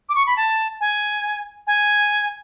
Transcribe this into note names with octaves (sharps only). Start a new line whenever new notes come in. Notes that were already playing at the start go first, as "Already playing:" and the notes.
D6
C#6
B5
A5
G#5
G#5